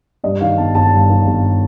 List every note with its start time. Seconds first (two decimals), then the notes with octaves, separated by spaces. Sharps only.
0.24 G2 D#5
0.40 D#3 F5
0.57 G1 A5
0.74 G1 A5
0.92 G2
1.10 D#3
1.26 G1